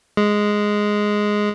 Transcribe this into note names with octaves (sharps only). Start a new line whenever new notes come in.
G#3